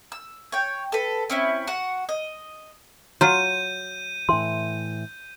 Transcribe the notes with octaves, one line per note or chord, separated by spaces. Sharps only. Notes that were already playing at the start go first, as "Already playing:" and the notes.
E6
C#5 G5
A4 B4
C4 C#4 E4
F#4 F#5
D#5
F#3 F4 F#4 G6 D#7
A2 E3 C6